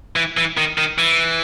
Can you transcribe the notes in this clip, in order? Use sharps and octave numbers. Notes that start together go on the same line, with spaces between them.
E3
E3
D#3
D#3
E3